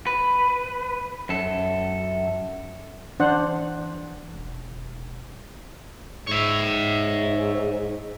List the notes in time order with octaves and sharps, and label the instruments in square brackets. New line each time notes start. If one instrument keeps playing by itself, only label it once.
[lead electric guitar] B4
F#2 A4
[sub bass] E3 [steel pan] D4 C5 F#5
[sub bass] E1
[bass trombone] G#2 [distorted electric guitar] C#5 E5